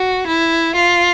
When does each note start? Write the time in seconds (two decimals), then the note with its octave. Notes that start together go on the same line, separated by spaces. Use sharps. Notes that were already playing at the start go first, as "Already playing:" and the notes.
Already playing: F#4
0.27 E4
0.75 F4